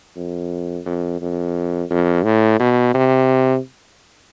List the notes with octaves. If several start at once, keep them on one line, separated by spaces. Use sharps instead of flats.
F2
F2
F2
F2
A2
B2
C3